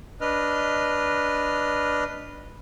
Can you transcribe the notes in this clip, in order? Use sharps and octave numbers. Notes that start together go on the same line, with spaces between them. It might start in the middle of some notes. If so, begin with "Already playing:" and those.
D4 B4 D#5 F6